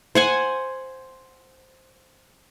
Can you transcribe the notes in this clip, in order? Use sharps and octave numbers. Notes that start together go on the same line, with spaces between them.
C5 F#5 G#5